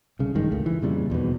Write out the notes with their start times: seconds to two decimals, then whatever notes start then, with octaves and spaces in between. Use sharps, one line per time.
0.19 C2 C#3
0.35 A1 G2 D#3 G#3
0.51 C#2 A3
0.66 E3
0.82 F2 A#2 C#3 G3
1.10 D#1 E2 G#2 B2